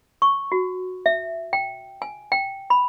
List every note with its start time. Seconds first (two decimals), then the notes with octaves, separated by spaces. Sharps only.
0.22 C#6
0.52 F#4
1.06 E5
1.53 G5
2.02 G#5
2.32 G5
2.70 B5